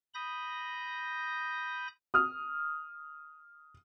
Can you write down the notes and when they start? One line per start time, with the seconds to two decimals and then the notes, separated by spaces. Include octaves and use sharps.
0.14 B5 D#6 G6 A#6
2.14 D#6 F6